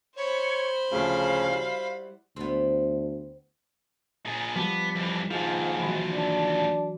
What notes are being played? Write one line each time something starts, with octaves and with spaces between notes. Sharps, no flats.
C5 C#5 B5
D2 C#3 F3 A3 F5
G3 E4 F#4
D2 B3 C4
A#2 G#4
F3 G3 B3
F2 E3
D#2 G#2 F3 F4
E3 F#3
D4